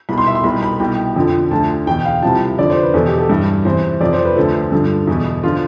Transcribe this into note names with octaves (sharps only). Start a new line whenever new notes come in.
C2 B2 B5
C6
E5
C6
C2 B2 B5
B5
C2 B2 G5
F2 D3 F3
D2 D3 F3 A5
E2 B2 G5
F5
C2 C3 F3 A5
F2 D3 F3 D5
C5
B4
E2 B2 A4
G4
A4
G2 E3
E2 C3 E3 C5
F2 C3 F3 D5
C5
B4
D2 D3 F3 A4
G2 D3 F3
E2 B2
D3 F3 F4